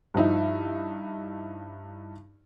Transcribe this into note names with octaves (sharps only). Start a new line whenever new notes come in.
G2 F3 D#4 E4